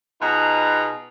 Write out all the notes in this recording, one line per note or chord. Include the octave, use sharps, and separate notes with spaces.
B2 D#4 F4 G#4 B4 A#5